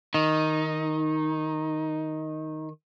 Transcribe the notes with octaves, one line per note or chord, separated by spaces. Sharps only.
D#3 D#4